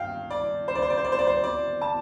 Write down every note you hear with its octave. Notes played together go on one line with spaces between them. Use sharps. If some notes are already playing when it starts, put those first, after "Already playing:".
Already playing: G2 F5 G5
D5
C5
D5
C5
D5
C5
D5
C5
D5
C5
D5
A5